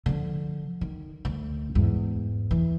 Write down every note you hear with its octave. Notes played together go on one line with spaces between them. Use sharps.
D3 F3
D#3
D2
E2 G#2
E3